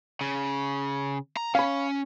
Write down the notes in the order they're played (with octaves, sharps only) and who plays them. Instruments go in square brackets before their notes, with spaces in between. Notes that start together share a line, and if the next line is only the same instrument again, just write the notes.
[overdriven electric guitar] C#3
A#5
[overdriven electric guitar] C#4 [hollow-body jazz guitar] F5 B5